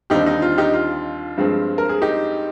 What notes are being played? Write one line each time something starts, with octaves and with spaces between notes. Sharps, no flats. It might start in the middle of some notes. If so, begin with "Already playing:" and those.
D#2 D3 G3 C4 D#4 G4
D#4
F4
D#4 G4
F4
G2 F3 G#3 C4
A#4
G#4
D#4 G4